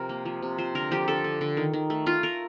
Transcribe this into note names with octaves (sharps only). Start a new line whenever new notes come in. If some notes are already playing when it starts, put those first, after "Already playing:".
Already playing: C3 F3 A#4
A#3
F3
C3
F3 C5
D3 A#4
F3 G4
D3 A4
D3
D3
D#3
D#3
A3
A3 F4
A3 A#4